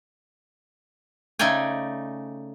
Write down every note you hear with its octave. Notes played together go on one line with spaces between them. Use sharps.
C#3 A3 D#4 D5 G5 G#5